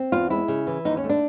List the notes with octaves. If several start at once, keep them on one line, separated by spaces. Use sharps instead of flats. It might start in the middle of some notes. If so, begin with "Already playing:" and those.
Already playing: C4
E2 F4
G#3 E4
C#3
E3
D#2 D#4
C#4
A3
D4